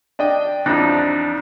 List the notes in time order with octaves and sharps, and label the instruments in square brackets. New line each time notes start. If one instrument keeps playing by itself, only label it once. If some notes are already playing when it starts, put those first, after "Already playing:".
[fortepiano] D4 D#5 G5
[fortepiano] A1 F2 F#6 [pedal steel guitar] D4 D#4